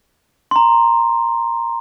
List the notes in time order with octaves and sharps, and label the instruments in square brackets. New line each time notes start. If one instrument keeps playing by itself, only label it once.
[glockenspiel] A#5 C6